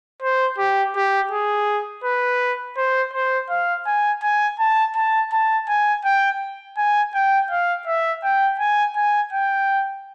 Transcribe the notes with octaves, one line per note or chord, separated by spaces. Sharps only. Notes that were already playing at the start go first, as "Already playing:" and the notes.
C5
G4
G4
G#4
B4
C5
C5
F5
G#5
G#5
A5
A5
A5
G#5
G5
G#5
G5
F5
E5
G5
G#5
G#5
G5